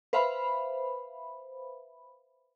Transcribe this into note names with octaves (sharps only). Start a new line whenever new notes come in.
B4 C5 E5 F5 B5